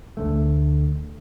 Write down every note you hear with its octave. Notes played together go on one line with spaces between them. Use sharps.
D2 D3 A3